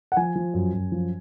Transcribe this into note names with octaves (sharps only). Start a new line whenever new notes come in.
F#5
F3 G#5
F3
F#2
F#2
F3